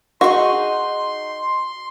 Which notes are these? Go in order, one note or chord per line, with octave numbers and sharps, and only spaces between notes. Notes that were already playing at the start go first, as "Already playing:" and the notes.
D#4 F#4 G#4 C6